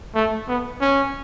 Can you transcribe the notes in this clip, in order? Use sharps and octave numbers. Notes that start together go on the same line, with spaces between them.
A3
B3
C#4